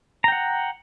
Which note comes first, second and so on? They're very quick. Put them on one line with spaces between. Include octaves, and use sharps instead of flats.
A#5 G5 F#5